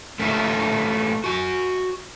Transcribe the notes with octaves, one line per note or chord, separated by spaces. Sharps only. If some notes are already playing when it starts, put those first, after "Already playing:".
A3 C#4 D#4 F4 E5
F#4 G#5